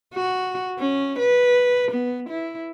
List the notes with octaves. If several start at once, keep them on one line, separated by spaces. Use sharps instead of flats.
F#4
C#4
B4
B3
E4